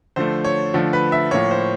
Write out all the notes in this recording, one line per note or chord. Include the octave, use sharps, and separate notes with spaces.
D3 F3 A3 C5
C#5
D3 F3 A3
B4
E5
A2 F3 A#3 C#5
C5